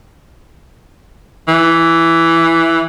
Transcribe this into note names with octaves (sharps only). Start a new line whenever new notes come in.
E3